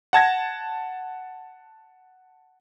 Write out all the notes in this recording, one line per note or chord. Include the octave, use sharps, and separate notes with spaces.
F#5 A5 G#6 A#6